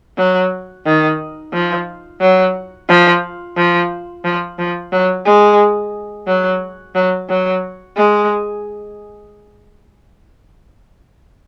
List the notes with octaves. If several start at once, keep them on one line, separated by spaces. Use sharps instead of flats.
F#3
D#3
F3
F#3
F3
F3
F3
F3
F#3
G#3
F#3
F#3
F#3
G#3